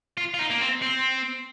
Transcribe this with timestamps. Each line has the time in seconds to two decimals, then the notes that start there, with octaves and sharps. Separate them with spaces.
0.17 F4
0.34 F4
0.39 D#4
0.50 A#3
0.60 C4
0.82 C4